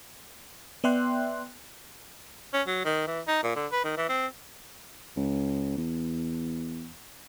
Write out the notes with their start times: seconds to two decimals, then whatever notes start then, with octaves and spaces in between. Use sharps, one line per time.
0.84 B3 D5 E5 G5 C6 F#6
2.54 C#4
2.67 F#3
2.85 D#3
3.07 E3
3.28 D#4
3.43 A#2
3.56 D3
3.72 B4
3.85 D#3
3.97 E3
4.09 C4
5.17 C#2
5.77 E2